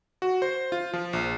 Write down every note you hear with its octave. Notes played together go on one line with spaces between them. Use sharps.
F#4
C5
F4
F3
A#1